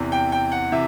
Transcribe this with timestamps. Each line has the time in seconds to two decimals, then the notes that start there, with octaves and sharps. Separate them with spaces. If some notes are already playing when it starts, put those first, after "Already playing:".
Already playing: E2 C3 E3
0.12 G5
0.32 G5
0.52 F#5
0.72 C3 E3 E5